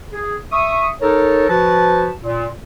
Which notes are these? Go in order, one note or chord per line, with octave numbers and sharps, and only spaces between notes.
G#4
E5 C#6 D#6
D#4 A4 A#4 C#5
F3 F#4 B4 A5
A#2